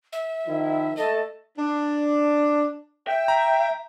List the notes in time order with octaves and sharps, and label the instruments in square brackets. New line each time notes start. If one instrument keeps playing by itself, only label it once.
[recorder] E5
[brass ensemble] D#3 F3 E4
[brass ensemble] A3 A4 A5 [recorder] D#5
[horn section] D4
[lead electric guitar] E5 [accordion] G5
[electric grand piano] A#5